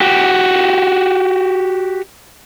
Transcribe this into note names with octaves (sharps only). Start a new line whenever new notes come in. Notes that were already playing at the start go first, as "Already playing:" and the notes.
F#4 G4